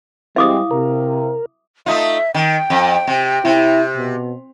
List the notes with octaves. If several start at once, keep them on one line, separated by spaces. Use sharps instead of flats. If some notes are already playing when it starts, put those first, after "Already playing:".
G3 G#3 C4 E4 E5 F5 D6 D#6
C3 A#4
A3 D#4 F4 E5
D#3 G5
F2
C3
C3 E4
B2